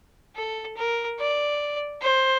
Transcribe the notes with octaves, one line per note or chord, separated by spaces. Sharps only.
A4
A#4
D5
C5